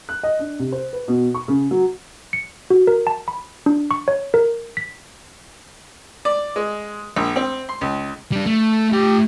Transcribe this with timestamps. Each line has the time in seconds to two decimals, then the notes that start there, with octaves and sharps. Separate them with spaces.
0.09 F#6
0.23 D#5
0.39 D4
0.59 C3
0.72 C5
0.93 B4
1.08 B2
1.34 C#6
1.48 C#3
1.71 F#3
2.33 C#7
2.70 F#4
2.87 A#4
3.07 A5
3.28 B5
3.66 D4
3.91 C#6
4.08 C#5
4.34 A#4
4.77 B6
6.25 D5
6.56 G#3
7.16 A#1
7.36 C4
7.69 C6
7.81 C#2
8.32 G3 D4
8.46 A3
8.92 A3 G4 G5